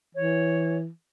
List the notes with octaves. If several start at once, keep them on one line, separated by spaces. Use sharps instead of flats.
E3 C#5